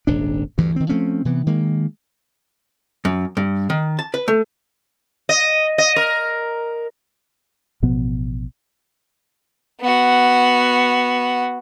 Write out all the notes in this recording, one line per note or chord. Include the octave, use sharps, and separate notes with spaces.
D#1 G#1 D4
D2 G2 E3
D#3 C4
F3 A3 C4 C#4
C3 E3 B3
D#3 G#3 A#3
F#2
G2
D#3
A5
B4
A3
D#5
D#5
A#4
A1 B2 F3 B3
B3 F#4